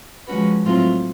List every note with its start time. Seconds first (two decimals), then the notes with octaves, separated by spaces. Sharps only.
0.27 F3 G#3 C#4 F#4 B4
0.65 A2 F#3 A3 C4 F4